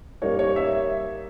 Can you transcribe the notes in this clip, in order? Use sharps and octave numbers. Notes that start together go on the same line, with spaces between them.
G3 A#3 D#4 C#5
C#5
E5